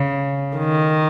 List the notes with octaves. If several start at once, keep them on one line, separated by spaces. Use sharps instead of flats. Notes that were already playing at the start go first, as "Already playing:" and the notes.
Already playing: C#3
D#3